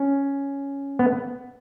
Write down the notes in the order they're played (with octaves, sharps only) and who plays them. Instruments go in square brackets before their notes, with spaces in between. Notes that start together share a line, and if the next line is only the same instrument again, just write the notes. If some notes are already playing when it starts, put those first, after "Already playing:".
Already playing: [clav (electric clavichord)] C#4
B3